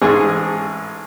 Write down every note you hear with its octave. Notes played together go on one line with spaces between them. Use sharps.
A1 G#2 G#4 C#6